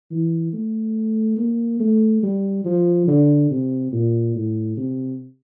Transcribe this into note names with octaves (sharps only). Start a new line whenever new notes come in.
E3
A3
A#3
A3
G3
F3
D3
C3
A#2
A2
C3